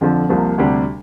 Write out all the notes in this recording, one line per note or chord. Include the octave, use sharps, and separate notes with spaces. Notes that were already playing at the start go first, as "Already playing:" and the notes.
F2 D3 F3
C2 C3 F3 A#3
D2 C3 G3 D4